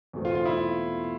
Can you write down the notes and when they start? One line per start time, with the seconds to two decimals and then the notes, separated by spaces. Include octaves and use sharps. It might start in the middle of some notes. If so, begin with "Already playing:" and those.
0.13 E2 B2 A3 C4
0.25 F4
0.35 F4
0.45 E4